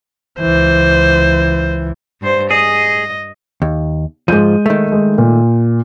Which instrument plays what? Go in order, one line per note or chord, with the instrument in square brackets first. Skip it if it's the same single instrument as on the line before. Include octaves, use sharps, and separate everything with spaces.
[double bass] C#2 E3 [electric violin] C5
[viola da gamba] G2 C5
[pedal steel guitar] G#4 [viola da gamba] D#5
[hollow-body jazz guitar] D#2
[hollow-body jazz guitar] G#2 F3 [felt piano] G#3 G6 D#7
[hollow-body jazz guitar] D#3 A3
[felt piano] G#3
A#2